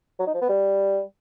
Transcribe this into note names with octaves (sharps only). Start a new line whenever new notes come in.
F#3
D#4
F3
B3
G3